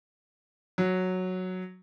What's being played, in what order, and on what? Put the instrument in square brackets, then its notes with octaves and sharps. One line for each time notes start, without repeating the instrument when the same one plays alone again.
[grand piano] F#3